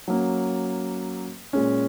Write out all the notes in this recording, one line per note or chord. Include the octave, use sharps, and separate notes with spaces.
F#3 A#3 C#4
A#2 G#3 C#4